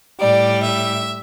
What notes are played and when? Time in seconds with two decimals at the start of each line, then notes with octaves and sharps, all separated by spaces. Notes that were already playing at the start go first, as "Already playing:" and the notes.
0.19 A2 G3 D5
0.62 E5